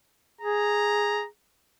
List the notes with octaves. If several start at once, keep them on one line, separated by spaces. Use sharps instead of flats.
G#4 A#5